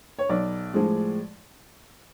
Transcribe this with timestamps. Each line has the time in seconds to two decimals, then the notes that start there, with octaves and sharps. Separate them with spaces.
0.19 C#5
0.29 B1 D5
0.74 A2 F3 G#3